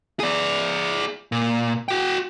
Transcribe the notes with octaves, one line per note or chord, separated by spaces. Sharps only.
G#4 D5
A#2
F#4 G5